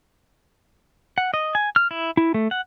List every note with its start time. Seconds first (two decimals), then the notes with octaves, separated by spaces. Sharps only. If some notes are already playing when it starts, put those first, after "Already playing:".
1.18 F#5
1.34 D#5
1.55 G#5
1.76 F6
1.91 E4
2.17 E4
2.34 A3
2.51 F#5